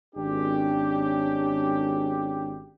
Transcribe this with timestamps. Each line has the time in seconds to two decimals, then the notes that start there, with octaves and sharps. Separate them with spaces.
0.15 G#1 C#4 D4 G4